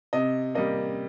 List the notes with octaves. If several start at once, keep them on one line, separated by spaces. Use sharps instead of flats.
C3 D#5
G3 A#3 D#5